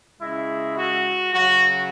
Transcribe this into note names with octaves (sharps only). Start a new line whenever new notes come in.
C#3 G#3 E4
F#4
C#3 F#3 F#4